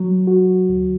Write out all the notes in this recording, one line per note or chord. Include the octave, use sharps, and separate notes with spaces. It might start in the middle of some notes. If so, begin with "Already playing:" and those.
Already playing: F#3
F#4
D2